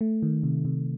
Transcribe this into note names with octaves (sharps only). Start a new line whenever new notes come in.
A3
D#3
C3
C3